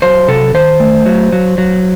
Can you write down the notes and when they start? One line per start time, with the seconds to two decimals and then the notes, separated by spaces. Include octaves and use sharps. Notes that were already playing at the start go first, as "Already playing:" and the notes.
0.02 F#3 C5
0.28 C3 A4
0.54 D#3 C5
0.80 A3
1.06 F#3
1.32 F#3
1.58 F#3